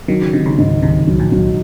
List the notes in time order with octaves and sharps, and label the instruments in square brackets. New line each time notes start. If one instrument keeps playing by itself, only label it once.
[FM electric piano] D#3 [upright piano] F#3
[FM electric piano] C#3
[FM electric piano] C3 [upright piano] D#3
[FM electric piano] C#2 C#3
[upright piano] G#2
[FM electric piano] C2 C3 [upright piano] D#3
[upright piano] F#3
[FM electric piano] A#1 A#2
[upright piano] F#3